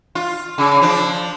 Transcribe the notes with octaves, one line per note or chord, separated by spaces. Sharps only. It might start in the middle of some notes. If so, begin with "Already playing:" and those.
F4
C#3
F3 D4